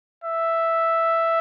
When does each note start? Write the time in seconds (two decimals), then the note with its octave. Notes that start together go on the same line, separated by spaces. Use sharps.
0.24 E5